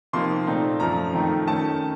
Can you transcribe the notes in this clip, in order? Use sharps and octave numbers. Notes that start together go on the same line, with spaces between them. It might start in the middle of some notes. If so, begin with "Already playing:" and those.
C3 F3 A#3 D#4 C6
A#2 A3 C4 D#4
F#2 F3 A3 A#5
F2 D#3 A3 D#4
D#3 A3 C#4 A5